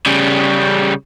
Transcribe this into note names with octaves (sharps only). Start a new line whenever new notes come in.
C#3 G3